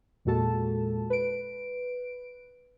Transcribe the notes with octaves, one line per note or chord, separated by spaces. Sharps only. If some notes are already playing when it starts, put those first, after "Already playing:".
E2 A#2 G#3 F#4 A4 A5
B4 D7